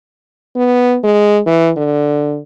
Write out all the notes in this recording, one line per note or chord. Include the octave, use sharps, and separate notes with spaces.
B3
G#3
E3
D3